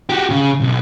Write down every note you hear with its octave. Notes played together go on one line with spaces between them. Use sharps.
F#4 G4
C#3
B1